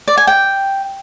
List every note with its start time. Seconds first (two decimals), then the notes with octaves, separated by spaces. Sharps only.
0.08 D5
0.17 G#5
0.27 G5